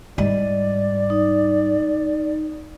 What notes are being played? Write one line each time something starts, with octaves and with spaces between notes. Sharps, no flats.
G#2 G3 D5 D#5
D#4